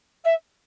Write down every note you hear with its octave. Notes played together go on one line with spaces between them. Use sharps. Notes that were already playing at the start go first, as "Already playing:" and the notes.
E5